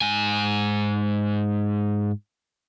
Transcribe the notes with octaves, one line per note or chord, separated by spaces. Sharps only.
G#2 G#5